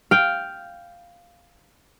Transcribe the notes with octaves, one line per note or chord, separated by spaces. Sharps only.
F5 G5